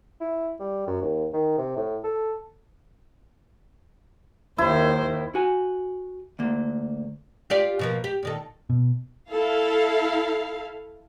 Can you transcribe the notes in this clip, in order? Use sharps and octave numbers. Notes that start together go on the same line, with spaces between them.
E4
G3
F#2
D#2
D#3
C3
A2
A4
D#2 D#3 E4 C5
F#4 G#5
D2 A#3
F4 G4 D5
B2 F3 A#3
G4
A#2 D#3 A4
B2
E4 A4 F5